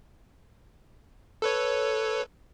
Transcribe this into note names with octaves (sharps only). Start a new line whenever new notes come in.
A4 B4 C#5